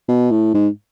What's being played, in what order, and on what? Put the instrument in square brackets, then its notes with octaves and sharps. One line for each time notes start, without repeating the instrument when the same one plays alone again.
[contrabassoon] B2
A2
G#2